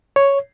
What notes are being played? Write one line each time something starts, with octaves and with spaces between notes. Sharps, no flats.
C#5